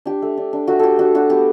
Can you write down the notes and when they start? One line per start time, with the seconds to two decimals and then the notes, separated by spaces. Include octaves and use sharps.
0.06 D4 G4
0.22 A3
0.37 D4
0.53 D4
0.68 A3 F#4
0.79 A3 G4 A4
0.99 D4 F#4
1.15 D4 F#4
1.30 B3 G4